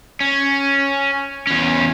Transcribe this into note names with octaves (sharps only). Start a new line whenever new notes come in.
C#4
E2 C#4